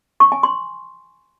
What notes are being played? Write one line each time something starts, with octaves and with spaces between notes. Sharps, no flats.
C#6
G#5
C6